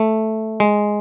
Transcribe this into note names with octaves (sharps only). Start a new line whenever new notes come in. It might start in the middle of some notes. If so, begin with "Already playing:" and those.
Already playing: A3
G#3